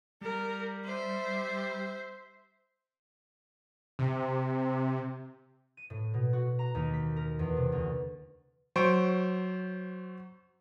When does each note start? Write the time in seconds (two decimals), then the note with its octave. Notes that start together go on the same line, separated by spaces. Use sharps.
0.21 G3 A#4
0.84 C5 E5
3.99 C3
5.77 D#7
5.90 A2
6.14 B2
6.33 F#4
6.59 A#5
6.75 D#2
6.94 B6
7.16 A#4
7.39 E2
7.57 C3
7.72 D2
8.76 F#3 C5 C#6 D7